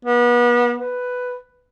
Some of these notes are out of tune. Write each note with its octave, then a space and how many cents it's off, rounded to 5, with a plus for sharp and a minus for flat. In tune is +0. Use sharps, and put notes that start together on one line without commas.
B3 -35
B4 +5